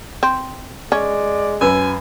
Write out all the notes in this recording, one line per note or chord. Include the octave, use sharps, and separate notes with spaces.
C4
G#3 C#4 D5
F#2 B4 G#5 E6